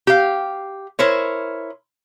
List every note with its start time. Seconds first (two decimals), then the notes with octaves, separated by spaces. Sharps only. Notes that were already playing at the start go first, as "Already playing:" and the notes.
0.07 G4 F5
0.99 E4 A#4 C5 C#5